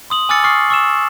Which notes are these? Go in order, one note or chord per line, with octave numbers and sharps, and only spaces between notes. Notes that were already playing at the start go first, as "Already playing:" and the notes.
C6 D#6 F#7
G#5 D6 E6 F6 A6 C#7
C#6 D#6 F6 C7
C#6 E6 E7